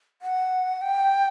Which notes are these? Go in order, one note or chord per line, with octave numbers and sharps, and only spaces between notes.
F#5
G5